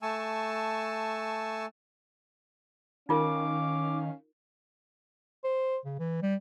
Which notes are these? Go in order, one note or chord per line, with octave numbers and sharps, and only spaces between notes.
A3 G#5 A5 C#6 E6
D#3 C#4 D#4 F4 A#4 F5 D6
C5
C#3
E3
G3